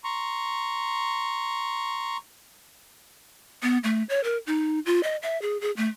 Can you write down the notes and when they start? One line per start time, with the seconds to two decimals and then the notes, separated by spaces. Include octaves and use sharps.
0.04 A#5 C6 C#6
3.63 B3
3.84 A3
4.09 C#5
4.24 A#4
4.47 D#4
4.86 F4
5.03 D#5
5.23 E5
5.42 G#4
5.61 G#4
5.77 A3